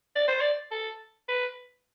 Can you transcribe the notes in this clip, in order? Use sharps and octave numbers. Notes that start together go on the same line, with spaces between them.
D5
C5
D5
A4
B4